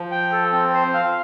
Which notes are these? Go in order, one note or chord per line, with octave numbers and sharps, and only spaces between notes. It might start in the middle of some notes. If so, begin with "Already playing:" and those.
Already playing: F3
G5
A4
C4
C5
F5